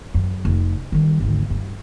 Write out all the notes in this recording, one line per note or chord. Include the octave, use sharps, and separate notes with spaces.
F#2
F1
D#3 G3
G#1 D2
G2 E4